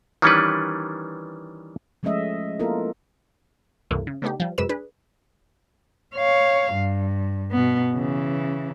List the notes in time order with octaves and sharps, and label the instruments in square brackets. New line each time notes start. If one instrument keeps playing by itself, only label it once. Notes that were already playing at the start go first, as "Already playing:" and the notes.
[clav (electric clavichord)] D#3 E3 G3 C#4 D4 B4
[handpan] F3 G#3 A3 C#4 D#5 E5
A#3 B3 E4 F4 A4 A#4
[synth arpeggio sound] C#2 G2 C3 E3 A3 A#3
C#3
C#3 A3 B3 D4 D#4 G4
F3 G3
F#2 C3 G#3 B4 E6 E7
D4 G#4 B4
[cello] C#5 F5
G2
B2 B3
C#3 E3